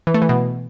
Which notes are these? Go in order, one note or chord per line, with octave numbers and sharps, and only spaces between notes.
E3
A3
E3
B2